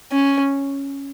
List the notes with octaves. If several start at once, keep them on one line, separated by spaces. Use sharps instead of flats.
C#4